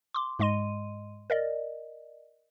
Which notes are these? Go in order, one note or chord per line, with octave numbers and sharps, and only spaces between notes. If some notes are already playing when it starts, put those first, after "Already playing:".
C6 D6
G#2 G#3 D#5 C6 D#7
A#4 D5 D#5